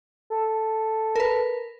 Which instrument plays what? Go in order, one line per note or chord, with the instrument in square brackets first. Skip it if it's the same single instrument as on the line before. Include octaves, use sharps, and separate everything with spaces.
[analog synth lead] A4
[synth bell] A#4 B4